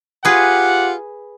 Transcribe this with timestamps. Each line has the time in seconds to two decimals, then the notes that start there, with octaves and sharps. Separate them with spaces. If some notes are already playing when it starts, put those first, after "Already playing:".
0.25 F4 G4 G#4 B4 F#5